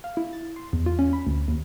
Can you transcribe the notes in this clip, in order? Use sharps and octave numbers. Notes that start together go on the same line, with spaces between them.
F5
E4
A6
C6
E2
F4
C#4
B5
D2
D#2